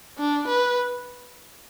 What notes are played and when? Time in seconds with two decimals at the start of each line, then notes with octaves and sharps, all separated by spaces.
0.18 D4
0.48 B4